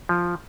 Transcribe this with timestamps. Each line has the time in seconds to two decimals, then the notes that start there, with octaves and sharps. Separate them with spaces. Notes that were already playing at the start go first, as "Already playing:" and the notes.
0.09 F3